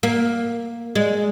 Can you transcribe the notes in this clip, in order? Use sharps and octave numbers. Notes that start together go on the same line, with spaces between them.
A#3
G#3